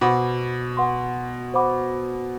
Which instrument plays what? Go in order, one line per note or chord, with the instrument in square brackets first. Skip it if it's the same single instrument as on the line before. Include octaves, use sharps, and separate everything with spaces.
[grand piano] B2 [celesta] C5 F#5 B5 D6
[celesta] B4 F#5 C6
C5 F#5 B5 D6